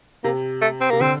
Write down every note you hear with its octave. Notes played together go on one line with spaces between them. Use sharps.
C3 A#3
A3
C4
C3 A#3
D3 C4